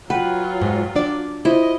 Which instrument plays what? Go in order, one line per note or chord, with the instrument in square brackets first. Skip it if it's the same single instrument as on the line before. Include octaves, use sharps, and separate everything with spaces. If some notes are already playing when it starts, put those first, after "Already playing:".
[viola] F#3 F4 [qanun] B4 [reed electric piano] F#5 G5
[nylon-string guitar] G#2
D4 D5
[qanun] E4 [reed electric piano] F4 C5 [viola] D#5